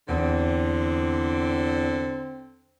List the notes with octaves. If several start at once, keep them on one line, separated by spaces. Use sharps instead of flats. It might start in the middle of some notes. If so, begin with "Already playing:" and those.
E2 D3 C4